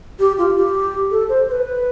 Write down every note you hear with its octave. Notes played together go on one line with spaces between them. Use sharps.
G4
F4
G4
A4
C5
C5
B4